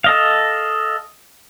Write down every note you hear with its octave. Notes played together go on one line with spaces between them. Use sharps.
A4 D#5 F5